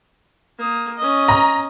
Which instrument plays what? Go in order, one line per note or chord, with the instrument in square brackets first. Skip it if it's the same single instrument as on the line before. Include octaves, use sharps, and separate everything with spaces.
[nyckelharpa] A#3 D#6
C#4 D#5
[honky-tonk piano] A#5